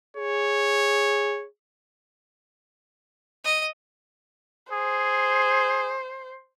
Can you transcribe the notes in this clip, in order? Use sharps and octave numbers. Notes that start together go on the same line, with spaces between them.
G#4 C#5
D#5
G#4 C5